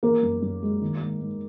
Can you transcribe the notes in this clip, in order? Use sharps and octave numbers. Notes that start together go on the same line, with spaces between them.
E3 A#3 A#4
F#2
F#2
G#3
D#3
G#2
G#2